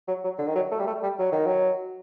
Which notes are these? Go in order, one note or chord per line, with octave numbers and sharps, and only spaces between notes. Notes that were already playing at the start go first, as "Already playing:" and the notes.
F#3
F#3
D3
D#3
F#3
A3
G3
A3
G3
F#3
D#3
F#3